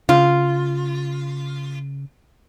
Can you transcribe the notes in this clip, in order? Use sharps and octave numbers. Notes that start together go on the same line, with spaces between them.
C#3 F4